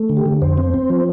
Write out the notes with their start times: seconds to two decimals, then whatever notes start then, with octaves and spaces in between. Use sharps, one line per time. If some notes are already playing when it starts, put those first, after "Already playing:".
Already playing: A3
0.09 D3
0.17 G4
0.26 D3
0.42 F2 C5
0.58 C4
0.74 C4
0.90 F3